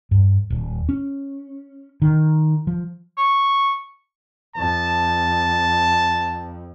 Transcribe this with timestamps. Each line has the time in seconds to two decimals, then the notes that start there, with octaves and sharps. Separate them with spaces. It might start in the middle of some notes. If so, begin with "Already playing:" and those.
0.11 G2
0.50 D#1
0.89 C#4
2.02 D#3
2.67 F3
3.18 C#6
4.56 F2 A5